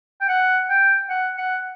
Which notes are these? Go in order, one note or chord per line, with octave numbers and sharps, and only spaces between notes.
G5
F#5
G5
F#5
F#5